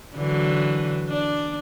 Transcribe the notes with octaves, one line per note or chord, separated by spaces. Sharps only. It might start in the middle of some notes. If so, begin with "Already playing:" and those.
D3 E3 F#3
D4